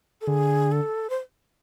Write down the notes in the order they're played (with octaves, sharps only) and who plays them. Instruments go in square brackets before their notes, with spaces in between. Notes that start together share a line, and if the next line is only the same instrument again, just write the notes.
[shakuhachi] A4
[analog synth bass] D3 [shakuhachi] G#4
[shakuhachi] A4
C5